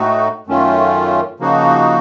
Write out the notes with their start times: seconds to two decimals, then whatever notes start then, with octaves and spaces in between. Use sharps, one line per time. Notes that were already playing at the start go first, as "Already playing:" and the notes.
Already playing: A2 A3 D#4 F#4
0.47 F#2 D#3 A3 C#4 F4
1.40 C#3 F3 A#3 D#4 F#4